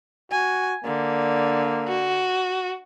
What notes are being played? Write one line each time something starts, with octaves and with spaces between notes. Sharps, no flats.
F#4 G#5
D3 A#3
F#4